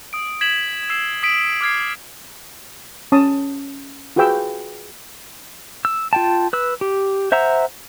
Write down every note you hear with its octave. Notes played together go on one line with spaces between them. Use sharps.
D#6 D7
G#6 B6 E7 F#7
E6 C7 E7
D#6 B6 D7
D6 F6 G#6 C7
C#4 A5 D#6
F4 F#4 G#4 B4 G5 E6
E6
F4 G5 A5
B4 E6
G4
C5 E5 F#5 A#5 E6